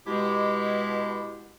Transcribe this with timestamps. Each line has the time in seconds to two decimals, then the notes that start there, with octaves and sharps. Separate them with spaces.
0.07 B2 G#3 E4 G4